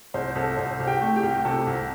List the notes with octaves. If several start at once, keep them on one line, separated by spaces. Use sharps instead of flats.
C2 C5
C2 A4
C2 C5
C2
G4 G5
A3
G4 G5
C2
C3 A4
C2